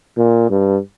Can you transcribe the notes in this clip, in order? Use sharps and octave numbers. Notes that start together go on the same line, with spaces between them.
A#2
G2